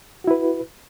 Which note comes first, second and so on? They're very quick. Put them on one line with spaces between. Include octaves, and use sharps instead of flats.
F#4 E4 B4